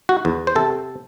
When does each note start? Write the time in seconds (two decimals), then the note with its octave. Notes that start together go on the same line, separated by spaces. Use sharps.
0.09 F#4
0.25 E2
0.47 C5
0.55 C3 A4